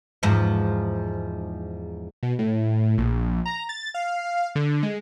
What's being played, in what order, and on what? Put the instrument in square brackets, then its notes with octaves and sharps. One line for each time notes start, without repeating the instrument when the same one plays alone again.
[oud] E2 G#2 F3
[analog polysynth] B2
A2
A#1
A#5
A6
F5
D3
G#3